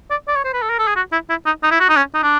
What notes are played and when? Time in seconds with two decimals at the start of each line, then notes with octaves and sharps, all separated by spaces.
0.11 D5
0.28 D5
0.36 C#5
0.44 C5
0.53 B4
0.62 A4
0.69 A#4
0.79 A4
0.87 G#4
0.96 F#4
1.12 E4
1.29 E4
1.46 D#4
1.63 D#4
1.71 E4
1.80 F#4
1.89 D#4
1.97 C#4
2.14 D#4
2.23 D4